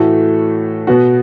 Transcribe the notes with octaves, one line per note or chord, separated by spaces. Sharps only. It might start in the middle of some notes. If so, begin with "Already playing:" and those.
Already playing: A2 E3 A3 F#4 A4
B2 B3 F#4